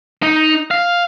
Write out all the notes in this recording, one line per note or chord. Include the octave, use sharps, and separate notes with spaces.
D#4
F5